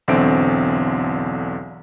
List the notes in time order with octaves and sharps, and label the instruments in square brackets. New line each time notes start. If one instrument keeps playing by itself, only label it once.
[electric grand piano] B1 E2 D3 C4 E5 D7